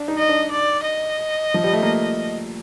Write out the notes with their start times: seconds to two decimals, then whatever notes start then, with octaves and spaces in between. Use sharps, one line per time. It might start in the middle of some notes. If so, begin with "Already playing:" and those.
Already playing: D4
0.08 D#4
0.18 D#5
0.29 D4
0.51 D5
0.84 D#5
1.54 F3
1.64 G3
1.73 A3
1.83 A#3